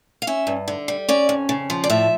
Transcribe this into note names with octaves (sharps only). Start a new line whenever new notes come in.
F5
C#4 E5
G2
D3
G3
C#4 D5
F2
C#3
F3
D5
A2 E5